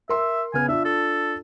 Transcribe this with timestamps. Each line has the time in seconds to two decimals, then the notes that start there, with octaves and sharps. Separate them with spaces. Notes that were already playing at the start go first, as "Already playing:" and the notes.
0.09 A#4 E5 C6 E6
0.54 C#3 B3 G#5 F6
0.68 D4 F4 E5
0.85 A4